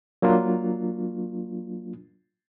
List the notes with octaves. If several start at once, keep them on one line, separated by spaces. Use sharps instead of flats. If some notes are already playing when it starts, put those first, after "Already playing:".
F#3 A#3 D4 F4